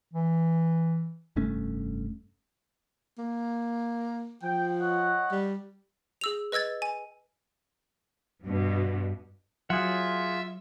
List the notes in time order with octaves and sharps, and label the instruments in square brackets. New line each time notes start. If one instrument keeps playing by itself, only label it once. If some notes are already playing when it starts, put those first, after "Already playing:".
[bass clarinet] E3
[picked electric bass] F1 G2 A3 C#4
[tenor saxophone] A#3
[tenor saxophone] F3 [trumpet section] G5
[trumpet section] C#5 D#5 F#5
[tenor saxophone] G3
[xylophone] G#4 E6 F7
B4 D#5 E6 G#6 A6
G#5
[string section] G2 B2
[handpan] F#3 [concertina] F4 [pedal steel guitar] G#4 F#5 [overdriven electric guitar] E5